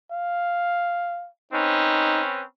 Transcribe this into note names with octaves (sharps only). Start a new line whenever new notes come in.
F5
C4 C#4 D#4 B4